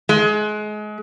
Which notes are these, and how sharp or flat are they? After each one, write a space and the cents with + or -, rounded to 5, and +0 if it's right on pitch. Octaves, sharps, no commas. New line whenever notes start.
G#3 +30